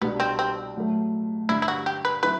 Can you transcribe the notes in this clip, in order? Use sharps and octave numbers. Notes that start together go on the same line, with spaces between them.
C2 B2 G3 B3 D4
C4
C4
A2 F#3 A3
G2 D3 G3 E4
E4
F#4
G4
B4
F#3 C4 E4 B4